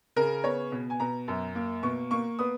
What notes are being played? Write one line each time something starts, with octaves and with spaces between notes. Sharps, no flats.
C#3 A#4
B3 C#5
B2
G#5
B2 A#5
F#2
A#3
B2 C#6
A#3 C#6
B3 D#6